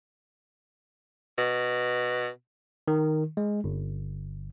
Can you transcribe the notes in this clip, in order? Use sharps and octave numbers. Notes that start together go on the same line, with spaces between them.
B2
D#3
G#3
G1